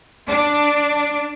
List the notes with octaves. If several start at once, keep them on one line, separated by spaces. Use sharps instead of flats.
D4